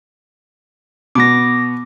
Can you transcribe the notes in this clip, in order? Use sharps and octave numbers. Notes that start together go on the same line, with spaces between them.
B2 B3 D6 A#6